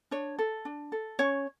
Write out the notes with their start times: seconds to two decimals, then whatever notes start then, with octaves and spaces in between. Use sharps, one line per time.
0.11 D4 C#5
0.39 A4
0.65 D4
0.92 A4
1.19 C#4 C#5